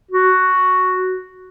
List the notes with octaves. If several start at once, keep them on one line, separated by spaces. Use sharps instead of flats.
F#4